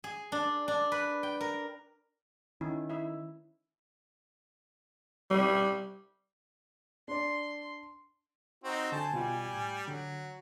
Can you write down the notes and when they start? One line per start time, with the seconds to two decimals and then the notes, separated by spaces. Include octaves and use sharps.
0.04 G#4
0.32 D4
0.68 D4
0.92 B4
1.23 G5
1.41 A#4
2.61 D#3 C#4 E4
2.90 E4 E5
5.30 G3
7.08 D4 D5 C6
8.64 C4 D#4 F#4
8.92 D3 F#4 C5 G#5 A5
9.14 B2 G3 F4 G4
9.54 A2
9.87 D3 F#3